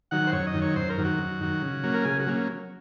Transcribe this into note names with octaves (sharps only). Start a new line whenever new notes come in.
D#3 F#3 F#5
C5
F#2 C#5
D#5
D#3 F#3
C#5
F#2 C5
A#4
D#3 F#3
F#4
F#2
D#3 F#3
C#3
F#3 A#3 C#4
A#4
C#3 G#4
F#4
F#3 A#3 C#4